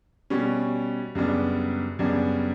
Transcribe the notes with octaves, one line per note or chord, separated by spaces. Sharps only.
B2 G3 C#4
F#2 C#3 G3 B3 D4
F#2 C#3 G3 B3 D4